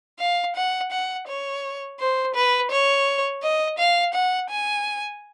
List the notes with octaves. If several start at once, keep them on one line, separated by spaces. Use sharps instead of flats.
F5
F#5
F#5
C#5
C5
B4
C#5
D#5
F5
F#5
G#5